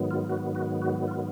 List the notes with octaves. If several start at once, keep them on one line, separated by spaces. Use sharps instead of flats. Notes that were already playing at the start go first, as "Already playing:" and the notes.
Already playing: G#2 D#3 F#3 B3
F4
F#4
F#4
F#4
F4